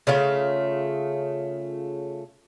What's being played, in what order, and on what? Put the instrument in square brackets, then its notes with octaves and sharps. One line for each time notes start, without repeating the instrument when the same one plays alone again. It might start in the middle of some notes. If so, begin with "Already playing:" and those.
[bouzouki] C#3 A3 F4 F5